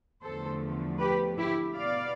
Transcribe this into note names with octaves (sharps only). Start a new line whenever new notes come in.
E2 D3 F3 A3 A4 C5
G4 B4
E4 G4
B2 B3 D5 F5